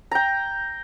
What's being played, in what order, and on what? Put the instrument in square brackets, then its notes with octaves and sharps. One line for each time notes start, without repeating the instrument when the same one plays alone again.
[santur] G5 A#5